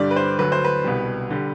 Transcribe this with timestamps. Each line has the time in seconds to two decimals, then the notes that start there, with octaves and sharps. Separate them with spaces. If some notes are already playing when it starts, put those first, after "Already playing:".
Already playing: G2 D3 G3 D5
0.11 B4
0.16 C5
0.38 D2 D3 F#3 B4
0.52 C5
0.65 B4
0.84 C2 B2 G3
1.30 D3 G3